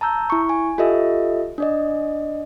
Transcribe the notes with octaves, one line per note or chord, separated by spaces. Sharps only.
A5 A#5 E6 G6
E4 C#6
G#5
F4 G4 A4 D#5 E5
D4 D5 D#5